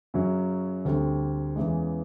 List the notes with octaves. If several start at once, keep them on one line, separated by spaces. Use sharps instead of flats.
F#2 C#3 F#3
D2 D3 G3 C4
E2 C#3 E3 G#3